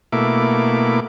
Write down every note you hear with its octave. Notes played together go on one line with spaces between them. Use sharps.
B2 A3 A#3 E4 D6